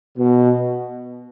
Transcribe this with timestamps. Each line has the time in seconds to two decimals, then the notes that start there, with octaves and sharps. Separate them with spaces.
0.17 B2